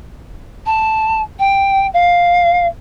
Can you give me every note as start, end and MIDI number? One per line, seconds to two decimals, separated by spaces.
0.66 1.21 81
1.39 1.87 79
1.93 2.66 77